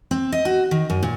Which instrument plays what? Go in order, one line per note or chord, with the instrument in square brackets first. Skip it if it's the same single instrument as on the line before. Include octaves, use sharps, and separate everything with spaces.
[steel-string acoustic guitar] C4
D#5
F#4
D#3
F#2
A#2